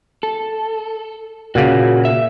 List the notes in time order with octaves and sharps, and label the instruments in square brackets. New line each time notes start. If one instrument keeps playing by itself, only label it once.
[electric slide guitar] A4
[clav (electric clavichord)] A#2 C#3 [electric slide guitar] F#4
[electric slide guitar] E5